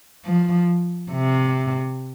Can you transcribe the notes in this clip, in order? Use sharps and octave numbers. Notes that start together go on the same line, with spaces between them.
F3
C3